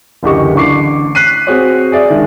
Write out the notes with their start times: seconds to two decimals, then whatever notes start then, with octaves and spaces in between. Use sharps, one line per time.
0.23 F#1 D2 E3 G4 D#5 C#6
0.55 A1 D3 C#6 D6 C7
1.15 F#6 B6 C7 D#7
1.47 C4 F#4 G#4 C#5
1.92 G#4 D5 E5
2.10 D#3 G#3 D4